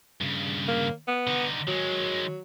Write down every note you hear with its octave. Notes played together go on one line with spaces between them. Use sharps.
G2 C#3
A#3
B3
D3 D#4
D#3 F#3 G#3